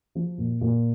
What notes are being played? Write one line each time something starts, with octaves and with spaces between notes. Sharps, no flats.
F3
A#2
A#2